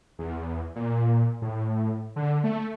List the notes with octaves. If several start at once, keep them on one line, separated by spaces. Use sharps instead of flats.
E2
A#2
A2
D3
A3